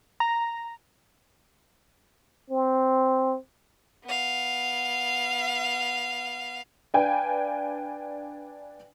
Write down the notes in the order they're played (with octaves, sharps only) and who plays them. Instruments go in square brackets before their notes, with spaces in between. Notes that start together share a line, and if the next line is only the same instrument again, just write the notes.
[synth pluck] A#5
[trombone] C4
[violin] B3 F5
[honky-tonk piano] D4 B4 F5 G5 G#5